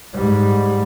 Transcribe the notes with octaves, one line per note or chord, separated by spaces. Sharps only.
G#2 G3